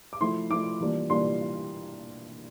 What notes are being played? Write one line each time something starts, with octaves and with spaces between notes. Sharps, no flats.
D6
F3 A3 E4 C6
F3 A3 E4 D6
E3 G3 A#3 D4 F4
E3 G3 A#3 D4 F4 C6